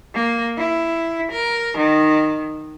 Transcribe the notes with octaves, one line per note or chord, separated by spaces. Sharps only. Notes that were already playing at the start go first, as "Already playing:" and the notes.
A#3
E4
A#4
D#3